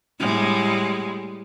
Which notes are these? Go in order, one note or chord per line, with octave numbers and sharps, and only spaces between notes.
A2 G3 G#3